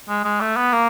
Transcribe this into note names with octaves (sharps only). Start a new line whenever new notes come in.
G#3
G#3
A3
B3
A#3